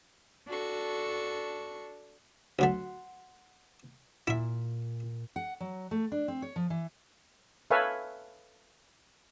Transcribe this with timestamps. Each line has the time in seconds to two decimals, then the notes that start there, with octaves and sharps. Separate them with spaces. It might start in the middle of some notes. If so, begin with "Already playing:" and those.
0.47 D4 F#4 A4 C#6
2.59 D2 F#3 A3 F#5 C6
4.27 A#2 E4 E5
5.36 F#5
5.60 F#3
5.91 A3
6.12 D4
6.28 C4
6.42 C#5
6.56 F3
6.70 E3
7.71 A4 B4 C#5 E5 F5 G#5